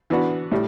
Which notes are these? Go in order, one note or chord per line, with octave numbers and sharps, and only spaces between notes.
E3 B3 D4 F#4
A2 G3